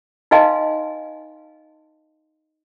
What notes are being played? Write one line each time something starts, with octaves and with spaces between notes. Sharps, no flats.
D#4 B4 D#5 F5 G#5 C6